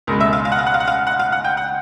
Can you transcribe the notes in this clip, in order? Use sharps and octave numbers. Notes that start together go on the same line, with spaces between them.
C#2 B2 G#3 A#4
E5
F5
F5
F#5
F5
F#5
F5
F#5
F5
F#5
F5
F#5
G5
F#5